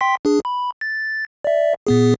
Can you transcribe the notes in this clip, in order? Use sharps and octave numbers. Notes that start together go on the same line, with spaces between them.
G5 C6 B6
D4 G#4
B5
A6
D5 E5
A#2 B3 G#4